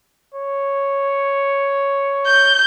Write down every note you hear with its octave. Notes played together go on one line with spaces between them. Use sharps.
C#5
G6